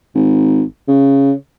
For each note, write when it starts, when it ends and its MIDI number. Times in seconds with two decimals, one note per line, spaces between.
0.15 0.62 32
0.88 1.32 49